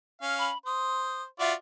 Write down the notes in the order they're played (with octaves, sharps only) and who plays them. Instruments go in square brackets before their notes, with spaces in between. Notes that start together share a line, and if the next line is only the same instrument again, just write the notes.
[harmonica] C#4 F5
[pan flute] B5
[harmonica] C5 [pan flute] D#6
[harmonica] F4 F#4 D5 [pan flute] E5